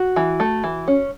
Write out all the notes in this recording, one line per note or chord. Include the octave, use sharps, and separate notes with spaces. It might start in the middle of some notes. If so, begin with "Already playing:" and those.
Already playing: F#4
E3
A3
E3
C#4